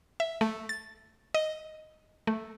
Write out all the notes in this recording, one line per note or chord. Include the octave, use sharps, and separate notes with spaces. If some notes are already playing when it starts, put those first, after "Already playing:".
E5
A3
A6
D#5
A3